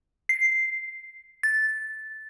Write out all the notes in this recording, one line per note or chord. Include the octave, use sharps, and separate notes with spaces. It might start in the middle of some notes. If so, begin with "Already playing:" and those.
C7
A6